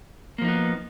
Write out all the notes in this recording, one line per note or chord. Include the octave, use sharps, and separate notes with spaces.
F3 A#3 B3 D#4